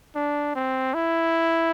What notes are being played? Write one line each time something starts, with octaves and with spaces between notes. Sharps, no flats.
D4
C4
E4